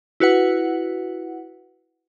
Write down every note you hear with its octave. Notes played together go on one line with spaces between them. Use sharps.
E4 F#4 B4 F#5